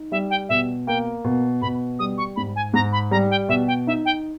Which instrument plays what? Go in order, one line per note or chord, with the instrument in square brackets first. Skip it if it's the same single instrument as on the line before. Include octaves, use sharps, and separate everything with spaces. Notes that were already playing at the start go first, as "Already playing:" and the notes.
Already playing: [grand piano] D#4
[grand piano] G3 [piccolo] E5
[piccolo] G5
[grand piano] B2 [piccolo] E5
[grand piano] A#3 [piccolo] G5
[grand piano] B2
[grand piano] B2 [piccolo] B5
[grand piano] G3 [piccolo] D#6
[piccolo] C#6
[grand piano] G#2 [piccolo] B5
[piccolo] G#5
[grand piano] G#2 [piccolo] A#5
[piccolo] B5
[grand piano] G3 [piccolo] A#5
[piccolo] G5
[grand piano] B2 [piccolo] E5
[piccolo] G5
[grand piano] D#4 [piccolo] E5
[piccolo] G5